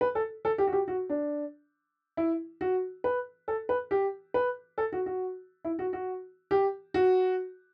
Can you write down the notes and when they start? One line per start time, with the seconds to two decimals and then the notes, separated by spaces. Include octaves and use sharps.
0.01 B4
0.15 A4
0.45 A4
0.58 G4
0.67 F#4
0.73 G4
0.88 F#4
1.09 D4
2.17 E4
2.61 F#4
3.04 B4
3.48 A4
3.69 B4
3.91 G4
4.34 B4
4.78 A4
4.92 F#4
5.06 F#4
5.65 E4
5.79 F#4
5.93 F#4
6.51 G4
6.94 F#4